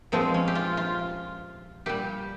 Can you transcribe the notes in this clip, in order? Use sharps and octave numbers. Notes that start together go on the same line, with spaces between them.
A#2 F3 G#3 C4
C#4
G4
F4
F4
A#2 G3 G4